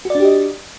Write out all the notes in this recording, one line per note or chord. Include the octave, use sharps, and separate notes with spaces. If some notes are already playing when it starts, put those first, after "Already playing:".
D4 F#4 G4 D5 D#5